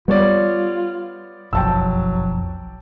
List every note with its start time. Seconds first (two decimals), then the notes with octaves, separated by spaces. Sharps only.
0.08 G3 B3 F4 C#5 D5
1.53 F#1 B1 F2 F#3 G5 A5 E6